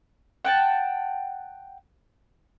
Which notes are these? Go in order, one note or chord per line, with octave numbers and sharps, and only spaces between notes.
F#5 G5 A5